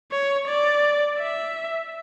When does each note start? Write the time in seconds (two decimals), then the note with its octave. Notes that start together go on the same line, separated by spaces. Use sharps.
0.12 C#5
0.48 D5
1.19 E5